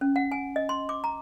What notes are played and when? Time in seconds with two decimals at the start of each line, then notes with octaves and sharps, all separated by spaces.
0.01 C#4
0.16 F#5
0.32 G#5
0.56 D#5
0.69 C6
0.89 D6
1.04 A#5